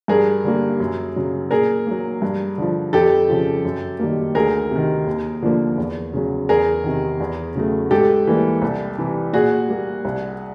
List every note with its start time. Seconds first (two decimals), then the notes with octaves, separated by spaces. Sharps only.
0.08 G2 G#4 A#4
0.44 D3 G3 A#3
0.80 F#2
1.16 C#3 F#3
1.51 A#2 G#4 A#4
1.87 F#3 A#3
2.22 G2
2.58 D3 F3
2.93 F2 G4 A4
3.28 C#3 F3
3.65 F#2
3.99 D#3 G3 A#3
4.35 D2 G#4 A#4
4.71 C3 D#3
5.07 D#2
5.42 D3 F3 A#3
5.78 E2
6.14 C#3 F#3
6.49 E2 G#4 A#4
6.84 C3 D#3
7.20 E2
7.56 C#3 F#3 A3
7.91 G#2 G4 A4
8.27 E3 G3 A#3
8.62 C2
8.98 C3 E3
9.33 A#2 F#4 G#4
9.69 G3 A#3
10.05 C2